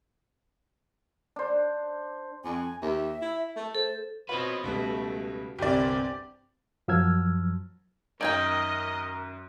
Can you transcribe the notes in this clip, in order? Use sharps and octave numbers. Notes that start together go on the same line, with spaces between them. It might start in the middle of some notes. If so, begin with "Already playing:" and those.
D4 C5
F2 G#5
D#2 E5
E4
A3
A4 C5
C4 F4 F#4 B4 C#5 D#5
C#2 B2 G3 A3
G1 C2 C4 G4 D5 G#5
F#2 F3 F#3 E6 F6 G#6
F#2 D#3 D#4 A#4 D#5 G5 G#6 D7